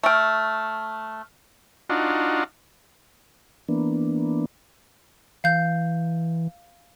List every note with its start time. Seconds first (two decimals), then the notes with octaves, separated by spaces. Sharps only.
0.03 A3 G5 C#6 F6
1.90 D4 D#4 F4 F#4
3.69 E3 A#3 B3 D4
5.44 E3 F5 G6